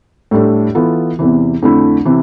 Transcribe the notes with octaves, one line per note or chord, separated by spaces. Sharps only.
A2 G3 D4 A4
E3 B3 F4 A4
E2 C3 E3
F2 D3 A3 E4
C3 E3